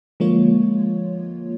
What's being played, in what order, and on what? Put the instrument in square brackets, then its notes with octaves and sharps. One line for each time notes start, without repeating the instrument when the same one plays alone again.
[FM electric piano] D3 F3 G#3 A#3 F4 C#5